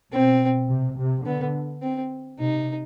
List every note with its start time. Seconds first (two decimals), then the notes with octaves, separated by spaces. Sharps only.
0.12 B2 C4
0.69 C3
0.98 C3
1.25 D3 B3
1.82 C4
2.39 C3 D#4